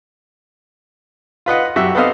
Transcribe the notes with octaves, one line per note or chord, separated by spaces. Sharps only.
F4 B4 D#5 F#5
F#2 F#4 G4 E5 E6
B3 C4 A4 C5 D#5 F5